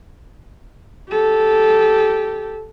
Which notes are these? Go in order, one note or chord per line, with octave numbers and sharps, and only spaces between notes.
G4 A4